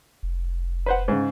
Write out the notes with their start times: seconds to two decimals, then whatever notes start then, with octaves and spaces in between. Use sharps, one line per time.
0.23 F1
0.86 B4 C5 F#5
1.08 G#2 C#3